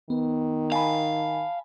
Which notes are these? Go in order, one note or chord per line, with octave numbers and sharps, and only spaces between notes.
D#3 B3
F5 G#5 A5 B5